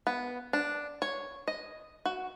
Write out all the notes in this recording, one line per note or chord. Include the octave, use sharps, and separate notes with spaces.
B3
D4
C#5
D#5
F#4